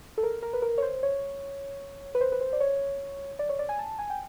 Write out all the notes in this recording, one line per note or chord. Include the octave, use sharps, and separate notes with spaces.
A4
A#4
A#4
B4
A#4
C#5
C5
C#5
B4
C5
B4
C5
D5
C#5
D5
C#5
D5
G#5
A5
G#5
G5